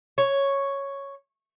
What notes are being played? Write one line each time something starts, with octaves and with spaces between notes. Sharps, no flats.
C#5